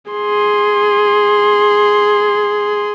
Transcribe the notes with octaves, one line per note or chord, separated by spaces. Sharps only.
G#4 C6